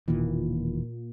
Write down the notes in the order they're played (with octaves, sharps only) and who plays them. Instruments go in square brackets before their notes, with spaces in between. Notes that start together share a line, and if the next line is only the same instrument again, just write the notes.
[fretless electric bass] E1 D#3 E3 [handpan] A#2 A#3